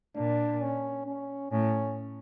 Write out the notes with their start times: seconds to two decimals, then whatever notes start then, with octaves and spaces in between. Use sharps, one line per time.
0.16 A#2 D4
0.61 C#4
1.06 C#4
1.51 A2 C#4